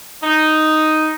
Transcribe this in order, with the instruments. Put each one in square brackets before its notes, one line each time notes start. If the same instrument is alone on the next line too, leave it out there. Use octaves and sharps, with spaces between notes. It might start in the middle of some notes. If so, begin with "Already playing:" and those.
[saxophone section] D#4